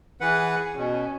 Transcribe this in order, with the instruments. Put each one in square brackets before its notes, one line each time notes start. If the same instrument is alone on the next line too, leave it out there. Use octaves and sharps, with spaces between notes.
[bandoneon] E3 B4 F#5 [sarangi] G#4
[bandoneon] B2 [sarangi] C#4